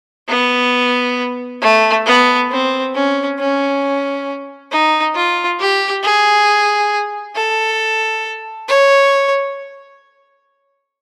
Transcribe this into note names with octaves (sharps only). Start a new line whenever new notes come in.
B3
A3
B3
C4
C#4
C#4
D#4
F4
G4
G#4
A4
C#5